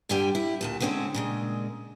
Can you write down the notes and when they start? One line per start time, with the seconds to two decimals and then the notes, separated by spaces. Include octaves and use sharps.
0.09 G2 D3 G3 G4 G5 G#5
0.35 E4
0.61 D2 A#2 A5
0.80 D3 G#3 C4 C#4 C5
1.14 A#2 C#3 G#3